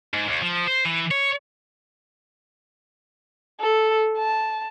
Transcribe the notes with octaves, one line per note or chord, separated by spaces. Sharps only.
G#2
D#2
F3
C5
E3
C#5
A4
A5